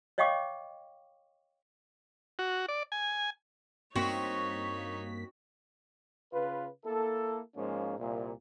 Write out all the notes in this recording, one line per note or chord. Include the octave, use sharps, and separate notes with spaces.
C#5 D#5 F5 G5 C#6 D6
F#4
D5
G#5
G2 A#3 C4 D#4 F#4 C#5 B6
C#3 F4 B4
A#3 E4 A4
G#2 F3 G#3 A#3 C#4
C2 A#2